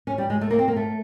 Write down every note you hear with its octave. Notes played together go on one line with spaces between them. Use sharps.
C#4
G3
G#3
A3
A#3
C4
A#3
A3